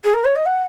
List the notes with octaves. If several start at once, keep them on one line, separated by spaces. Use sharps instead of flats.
G#4
A#4
C#5
D#5
F#5